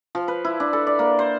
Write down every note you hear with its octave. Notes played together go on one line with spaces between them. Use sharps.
F3
B4
E4
D4
A4
D5
A#3
C5